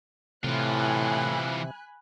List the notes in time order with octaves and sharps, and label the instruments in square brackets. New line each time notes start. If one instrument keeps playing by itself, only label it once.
[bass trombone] A2 [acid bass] C3 [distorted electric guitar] E3 F4 [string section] G#5 B5 F#6